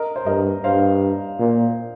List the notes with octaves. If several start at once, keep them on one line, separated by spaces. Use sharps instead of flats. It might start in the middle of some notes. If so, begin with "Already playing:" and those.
Already playing: A#4 D#5
C5
G2 A#4 D#5
G2 C5 F5
A#2